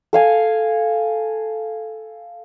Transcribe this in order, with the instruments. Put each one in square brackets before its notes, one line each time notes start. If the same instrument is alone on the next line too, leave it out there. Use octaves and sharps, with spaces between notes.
[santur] A4 F5 G#5